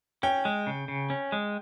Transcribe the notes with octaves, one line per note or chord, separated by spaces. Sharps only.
C#4 G5
G#3
C#3
C#3
C#4
G#3